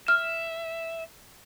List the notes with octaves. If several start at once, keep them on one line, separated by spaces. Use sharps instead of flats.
E5 F6